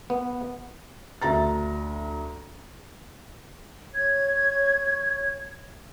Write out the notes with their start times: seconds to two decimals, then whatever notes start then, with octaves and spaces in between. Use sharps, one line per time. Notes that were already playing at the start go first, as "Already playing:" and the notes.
0.10 B3
1.22 D2 E5 A#5 A6
3.94 C#5 G#6